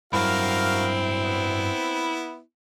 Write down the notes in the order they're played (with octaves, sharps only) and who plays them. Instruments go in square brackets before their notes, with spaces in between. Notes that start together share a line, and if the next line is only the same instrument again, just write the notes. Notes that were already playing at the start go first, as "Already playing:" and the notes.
[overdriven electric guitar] G2 F#3 [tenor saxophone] C4 [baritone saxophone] E4 [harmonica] F#4 A#4 F5
[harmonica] B3